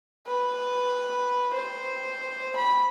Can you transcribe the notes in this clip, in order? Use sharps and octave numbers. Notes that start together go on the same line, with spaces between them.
B4
C5
B5